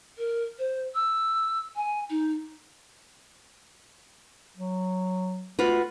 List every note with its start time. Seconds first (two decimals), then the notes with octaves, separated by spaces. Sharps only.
0.18 A#4
0.59 C5
0.95 E6
1.76 G#5
2.10 D#4
4.57 F#3
5.59 A3 F4 F#4 B4